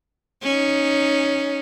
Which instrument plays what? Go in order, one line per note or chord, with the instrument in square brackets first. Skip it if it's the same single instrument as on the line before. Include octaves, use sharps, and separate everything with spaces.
[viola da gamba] C#4 D#4